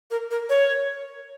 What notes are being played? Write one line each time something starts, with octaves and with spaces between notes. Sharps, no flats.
A#4
A#4
C#5